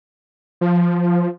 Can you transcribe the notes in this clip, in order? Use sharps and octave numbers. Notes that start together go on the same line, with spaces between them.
F3